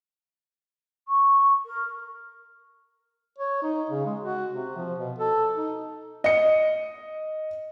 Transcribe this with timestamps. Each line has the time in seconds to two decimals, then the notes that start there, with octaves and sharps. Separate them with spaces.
1.08 C#6
1.65 A#4
3.38 C#5
3.63 D#4
3.90 C#3
4.06 G#3
4.20 F#4
4.53 C3
4.76 F3
4.98 B2
5.19 A4
5.56 D#4
6.24 D#5 C#7